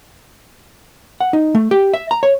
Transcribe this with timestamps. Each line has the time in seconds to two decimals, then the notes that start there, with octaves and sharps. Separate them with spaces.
1.20 F#5
1.33 D#4
1.55 A3
1.71 G4
1.94 E5
2.11 A#5
2.23 C#5